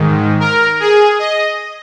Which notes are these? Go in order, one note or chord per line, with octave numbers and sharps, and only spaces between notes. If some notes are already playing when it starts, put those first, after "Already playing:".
Already playing: G#2 D#3
A#4
G#4
D#5